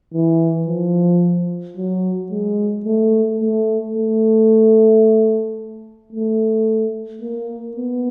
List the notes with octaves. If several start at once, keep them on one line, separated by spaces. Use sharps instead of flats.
E3
F3
F#3
G#3
A3
A3
A3
A3
A#3
B3